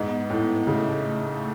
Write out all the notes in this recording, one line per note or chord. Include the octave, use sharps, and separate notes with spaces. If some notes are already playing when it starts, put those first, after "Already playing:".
Already playing: G#2 B3
A2
C#3 A3